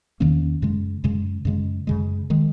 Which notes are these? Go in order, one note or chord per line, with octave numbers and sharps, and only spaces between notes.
E2 D#3 A#3 C#4
F#2 C#3 G#3
F#2 C#3 G#3
F#2 C#3 G#3
F#2 C#3 G#3
D#3 G#3